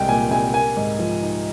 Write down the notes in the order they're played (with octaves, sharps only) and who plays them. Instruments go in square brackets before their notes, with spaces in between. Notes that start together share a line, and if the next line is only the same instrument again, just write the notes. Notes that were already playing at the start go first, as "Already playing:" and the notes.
Already playing: [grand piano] C2 G#3 G5
A#2 G#5
C2 G#5
A#3 G#5
G#2
F3
D#4